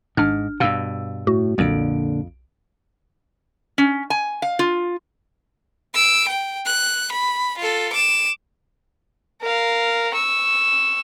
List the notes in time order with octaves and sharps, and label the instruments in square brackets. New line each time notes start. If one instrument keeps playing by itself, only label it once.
[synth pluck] G#1 D4 F6 [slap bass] G#2
[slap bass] G2 B2 [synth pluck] F5 E6
[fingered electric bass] A2 [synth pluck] F#4
[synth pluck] B1 D7 [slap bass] F2 [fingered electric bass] A#2 D3
[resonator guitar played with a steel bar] C#4
G#5
F5
F4
[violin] E6 D7
G5
F#6
B5
F4 A4
D6 E7
[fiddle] A#4 F5
C#6 E6